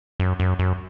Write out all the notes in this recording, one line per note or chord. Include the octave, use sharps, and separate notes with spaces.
F#2
F#2
F#2